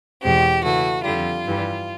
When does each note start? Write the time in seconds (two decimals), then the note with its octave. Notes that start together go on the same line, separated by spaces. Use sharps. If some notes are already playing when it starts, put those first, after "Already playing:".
0.22 E2 B2 G#3 C4 G4
0.64 C#3 E3 A3 F#4
1.04 F2 D3 G3 F4
1.45 G2 E3 G3